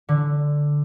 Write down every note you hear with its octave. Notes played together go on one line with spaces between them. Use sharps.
D3